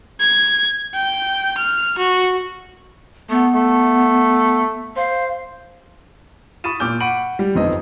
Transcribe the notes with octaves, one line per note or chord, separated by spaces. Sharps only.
G#6
G5
F6
F#4
A3 B3
A3
C5 F5
B5 C#6 D#6 A6 D#7 E7
A#2 D6 E6 F6 G6 G7
F#5 B5 C#6 D7 D#7 F#7
G3
G1 F2 B3 C4 D#4 D#5